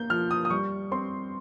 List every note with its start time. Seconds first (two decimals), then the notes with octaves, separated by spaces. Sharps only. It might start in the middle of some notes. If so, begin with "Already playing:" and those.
Already playing: A#3 G6
0.10 F3 F6
0.31 D#6
0.45 D#6
0.50 G3 C#6
0.92 C4 C6